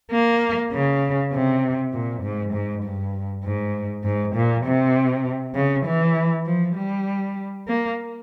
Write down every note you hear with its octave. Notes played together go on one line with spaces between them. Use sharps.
A#3
C#3
C3
A#2
G#2
G#2
G2
G#2
G#2
A#2
C3
C#3
E3
F3
G3
A#3